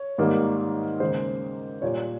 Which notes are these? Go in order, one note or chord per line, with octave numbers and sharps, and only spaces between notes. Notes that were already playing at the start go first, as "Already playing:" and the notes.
Already playing: C#5
G#2 D#3 G3 A#3
D#2 C#3 G#3 C5
A#2 G3 A#3 C#5